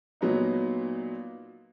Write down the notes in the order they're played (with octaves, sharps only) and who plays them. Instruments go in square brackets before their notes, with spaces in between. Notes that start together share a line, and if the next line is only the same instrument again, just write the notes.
[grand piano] A#2 F#3 B3 D#4